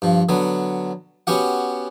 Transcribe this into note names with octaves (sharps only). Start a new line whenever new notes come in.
G2 F3
D3 F#3 B3
B3 C#4 F#4 G4 F#5